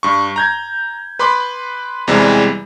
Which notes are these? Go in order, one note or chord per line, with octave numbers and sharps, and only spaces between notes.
G2 C#6
A#5 G6 G#6
B4 B5 C6 D6
E2 C3 E3 G3 G#3